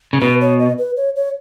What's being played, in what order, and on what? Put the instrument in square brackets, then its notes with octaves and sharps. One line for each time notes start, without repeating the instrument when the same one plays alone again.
[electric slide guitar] C#3
[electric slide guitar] B2 [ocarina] B4
[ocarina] C#5
D#5
B4
C#5
C#5